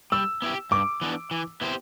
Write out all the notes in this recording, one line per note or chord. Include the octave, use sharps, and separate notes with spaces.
G3 E6
B3 E4 G4
G2 D6
E3 B3 D4
E3
B3 E4 G4 C5